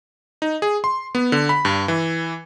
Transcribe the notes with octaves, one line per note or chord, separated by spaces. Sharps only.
D#4
G#4
C6
B3
D3
B5
G2
E3